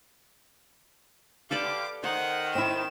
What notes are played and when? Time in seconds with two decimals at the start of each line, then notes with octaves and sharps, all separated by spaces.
1.51 D3 G4 A4 B4 D5 F5 D6
2.04 D#3 C5 F#5
2.55 C4 E4 E7